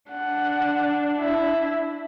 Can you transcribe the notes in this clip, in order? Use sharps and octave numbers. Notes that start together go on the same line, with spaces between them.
D4 F#5
E4